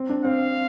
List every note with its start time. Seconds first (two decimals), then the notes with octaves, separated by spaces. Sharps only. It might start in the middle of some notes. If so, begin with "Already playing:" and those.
Already playing: C4
0.09 D4
0.24 C4 F5